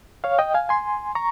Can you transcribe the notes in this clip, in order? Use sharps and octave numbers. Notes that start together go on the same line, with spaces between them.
C#5 F5
D#5 G5
F5 G#5
G#5 C6
A#5 C#6